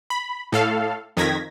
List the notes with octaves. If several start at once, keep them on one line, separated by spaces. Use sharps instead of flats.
B5
A2 A4 F5
F2 D#3 G#6 A#6 B6